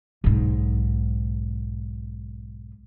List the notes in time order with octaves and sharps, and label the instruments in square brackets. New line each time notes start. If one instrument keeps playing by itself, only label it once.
[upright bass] B1 G#2